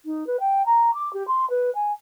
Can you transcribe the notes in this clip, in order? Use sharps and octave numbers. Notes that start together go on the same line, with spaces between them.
D#4
B4
G5
A#5
D6
G4
C6
B4
G#5